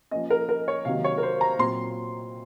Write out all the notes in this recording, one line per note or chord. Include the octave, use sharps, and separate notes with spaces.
F3 A#3 C#4 D#5
A#4
A#4
C#5
C3 D#3 F#3 A#3 F5
C#5
A#4
C5
A#5
A#2 F#3 C4 C6